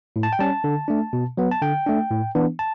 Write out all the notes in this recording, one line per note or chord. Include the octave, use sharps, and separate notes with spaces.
A2
A5
G5
G3 C#4 A5
D3
A3 D4
B2
F#3 B3
A5
D3 G5
A3 D4
A2
E3 B3 D4
A5